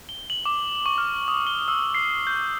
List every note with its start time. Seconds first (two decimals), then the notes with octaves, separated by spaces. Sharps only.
0.09 G7
0.30 F#7
0.46 D6
0.86 C#6
0.98 F6
1.28 D#6
1.47 G7
1.68 E6
1.94 C7
2.27 G6